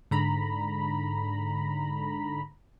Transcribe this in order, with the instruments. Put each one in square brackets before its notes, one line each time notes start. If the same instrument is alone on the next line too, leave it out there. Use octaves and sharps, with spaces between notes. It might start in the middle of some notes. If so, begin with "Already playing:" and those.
[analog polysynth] G#2 D3 A#5 B5